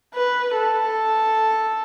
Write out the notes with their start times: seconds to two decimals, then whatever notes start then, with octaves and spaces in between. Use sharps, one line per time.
0.14 B4
0.56 A4